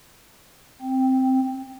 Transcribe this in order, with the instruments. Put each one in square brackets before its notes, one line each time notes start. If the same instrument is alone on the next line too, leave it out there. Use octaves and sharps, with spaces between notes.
[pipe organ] C4